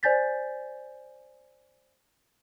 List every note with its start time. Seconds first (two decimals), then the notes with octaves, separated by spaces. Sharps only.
0.03 C5 D5 G#5 G6 A6 B6